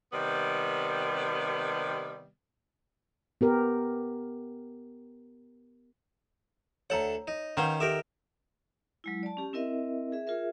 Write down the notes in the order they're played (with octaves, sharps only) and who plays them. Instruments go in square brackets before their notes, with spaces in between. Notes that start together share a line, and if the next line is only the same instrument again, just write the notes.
[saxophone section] C3 D#3 G3 B3
[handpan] B3 G4 A#4
[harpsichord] D2 A4 F#5 [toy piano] C#5 A#5
[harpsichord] D#4
[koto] D#3 [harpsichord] C#4 C5 F5 [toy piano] B4 F#5 A#5
[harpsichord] G4 A#4 E5 [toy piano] A4
[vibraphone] F#3 G#3 E4
D5 A5
C#4 G4
C4 E4 A#4 D#5 E5
G#4 E5
F4 G#4 A#4 E5